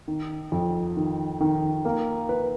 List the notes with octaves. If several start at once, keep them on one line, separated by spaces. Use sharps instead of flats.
D#3
F2
D#3
D#3
A#3
B4